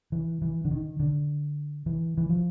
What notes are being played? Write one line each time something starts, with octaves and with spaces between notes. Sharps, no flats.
E3
E3
D3
D#3
D3
E3
E3
F3